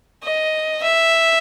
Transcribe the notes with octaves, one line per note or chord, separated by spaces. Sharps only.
D#5
E5